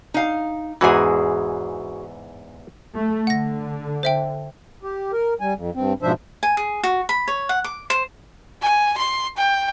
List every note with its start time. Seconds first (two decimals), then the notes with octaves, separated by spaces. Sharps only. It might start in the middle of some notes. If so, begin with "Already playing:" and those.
0.14 D#4 F5
0.81 E2 G#2 E3 F#4 G#4
2.94 A3
3.27 D3 F#5 A#6
4.03 C5 E5 G5
4.83 G4
5.13 A#4
5.41 G3 G#5
5.56 F2
5.75 G2 C4
6.02 G#2 B2 F3 D4 C5 E5
6.43 G#5
6.57 G#4
6.83 F#4
7.09 B5
7.28 C#5
7.49 F#5
7.64 D6
7.90 C5
8.62 G#5
8.98 C6
9.38 G5